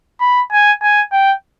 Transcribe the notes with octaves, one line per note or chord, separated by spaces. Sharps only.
B5
G#5
G#5
G5